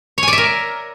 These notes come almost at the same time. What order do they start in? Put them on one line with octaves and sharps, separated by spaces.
C#5 G#5 D5 E5 A#4